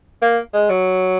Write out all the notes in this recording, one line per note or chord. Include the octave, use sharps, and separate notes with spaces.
A#3
G#3
F#3